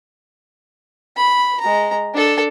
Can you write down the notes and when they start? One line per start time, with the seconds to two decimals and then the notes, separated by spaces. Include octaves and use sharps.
1.16 B5
1.60 G#3 A#5
2.14 D4 A4